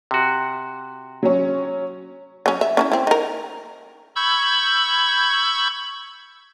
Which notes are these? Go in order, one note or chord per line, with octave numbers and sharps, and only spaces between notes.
C3 F#4
F#3 C#4
F#3 C#4
E5
C#4 D#4 E4
C4 E4
D#4 A#4
B5 C#6 E6 G6 G#6